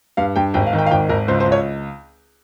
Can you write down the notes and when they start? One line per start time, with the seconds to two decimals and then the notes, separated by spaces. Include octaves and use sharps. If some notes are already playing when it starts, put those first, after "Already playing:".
0.17 G2 F5
0.36 G2 G5
0.54 G#1 G5
0.67 F5
0.73 D#3
0.78 G5
0.86 F5
0.91 G#1 G5
1.09 G#1 A#4
1.28 C#2 C5
1.40 C5
1.46 C#2
1.52 C#5